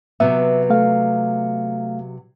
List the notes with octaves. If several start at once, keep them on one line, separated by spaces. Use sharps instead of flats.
C3 F#3 B3 E5
A3 F5